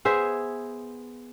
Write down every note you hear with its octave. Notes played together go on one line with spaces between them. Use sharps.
B3 G#4 C5 E5